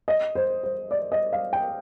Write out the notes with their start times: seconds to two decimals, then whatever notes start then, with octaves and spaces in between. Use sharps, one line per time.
0.08 D#5
0.35 C5
0.63 C5
0.91 D5
1.12 D#5
1.33 F5
1.53 G5